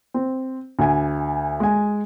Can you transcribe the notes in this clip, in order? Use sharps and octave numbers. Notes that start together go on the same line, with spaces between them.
C4
D2 G#5
G#3 G#5